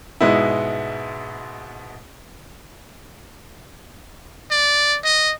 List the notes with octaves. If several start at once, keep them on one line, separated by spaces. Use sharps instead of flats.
G#2 B2 G#3 B3 E4
D5
D#5